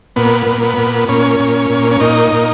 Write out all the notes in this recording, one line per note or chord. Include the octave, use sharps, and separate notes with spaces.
A#2 B3
A#2
B3
A#2
A#2 C#4
A#2
A#2
C#4
A#2 D#4
A#2